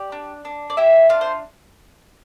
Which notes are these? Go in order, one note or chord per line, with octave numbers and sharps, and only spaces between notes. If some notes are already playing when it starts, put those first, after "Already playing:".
Already playing: G4 D5
D4
D4
D5
E4 G4 E5
D4 F4 F5
C5